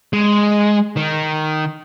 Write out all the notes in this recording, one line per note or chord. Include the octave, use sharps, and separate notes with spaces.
G#3
D#3